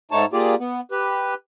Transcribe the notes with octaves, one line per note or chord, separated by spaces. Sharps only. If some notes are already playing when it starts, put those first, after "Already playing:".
G#2 A3 D#4 C#5 A5
A#3 F4 G4 G#4 D5
B3
G4 B4